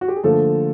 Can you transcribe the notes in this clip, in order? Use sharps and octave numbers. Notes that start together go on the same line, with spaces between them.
F#4
G4
G#4
D3 F3 A3 A#3 A4